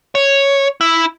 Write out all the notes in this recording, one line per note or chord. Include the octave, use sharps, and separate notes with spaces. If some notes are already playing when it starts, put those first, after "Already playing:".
C#5
E4